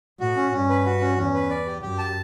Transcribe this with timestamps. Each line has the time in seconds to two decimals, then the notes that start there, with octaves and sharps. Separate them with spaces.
0.20 A2 F#4
0.36 C#4
0.52 G2 C#4
0.69 B4
0.86 F#4
1.01 C#4
1.17 E2 C#4
1.34 B4
1.50 D5
1.67 G4
1.82 F#2 G4
1.98 A5